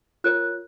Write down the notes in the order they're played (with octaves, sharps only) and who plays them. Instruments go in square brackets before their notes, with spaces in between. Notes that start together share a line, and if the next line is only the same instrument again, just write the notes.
[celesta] F4 A#4 C#5 F#6